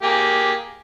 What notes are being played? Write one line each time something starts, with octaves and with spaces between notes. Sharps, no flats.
A#3 G4 G#4